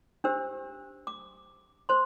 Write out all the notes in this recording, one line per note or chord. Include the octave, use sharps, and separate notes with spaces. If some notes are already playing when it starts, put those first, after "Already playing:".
D4 G4 C5 E6
D6
C5 C6